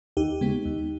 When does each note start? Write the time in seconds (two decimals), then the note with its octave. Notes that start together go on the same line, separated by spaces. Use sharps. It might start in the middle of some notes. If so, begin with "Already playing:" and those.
0.17 D#2 D#4 G4
0.41 C#3 G#3 B3
0.65 D#2